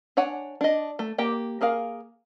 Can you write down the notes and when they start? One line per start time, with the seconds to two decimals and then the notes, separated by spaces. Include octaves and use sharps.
0.17 D4 C#5 F#5 G#5
0.61 D4 D#5
0.99 A3
1.18 A#3 G4 G5
1.61 A#3 G#4 A#4 F5